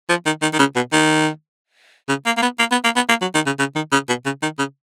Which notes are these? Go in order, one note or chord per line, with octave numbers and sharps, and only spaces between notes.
F3
D#3
D#3
D#3
C#3
B2
D#3
C#3
A#3
A#3
B3
A#3
B3
A#3
B3
A#3
F#3
D#3
C#3
C#3
D#3
C#3
B2
C#3
D#3
C#3